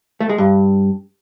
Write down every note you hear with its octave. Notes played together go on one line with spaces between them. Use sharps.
A3
G#3
G2